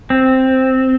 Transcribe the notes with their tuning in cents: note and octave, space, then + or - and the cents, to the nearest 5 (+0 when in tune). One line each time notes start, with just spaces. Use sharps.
C4 +0